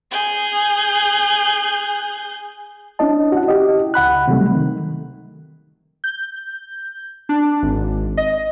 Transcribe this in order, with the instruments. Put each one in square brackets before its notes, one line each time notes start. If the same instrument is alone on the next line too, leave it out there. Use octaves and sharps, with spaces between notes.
[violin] G#4 G6
[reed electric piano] C#4 D4 E4 D#5 A5
F#4 F#5
E4 G4 D#5
C#2 F#5 B5 F#6
C3 D#3 F#3 G3 A3 C4
D#3
[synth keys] G6
D4
G#1
D#5